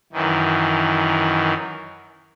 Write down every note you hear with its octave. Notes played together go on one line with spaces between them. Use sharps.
F#2 D#3 E3